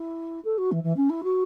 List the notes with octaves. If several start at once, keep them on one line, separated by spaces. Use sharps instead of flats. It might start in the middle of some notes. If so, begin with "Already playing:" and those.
Already playing: E4
A4
F#4
E3
E3
C#4
E4
F#4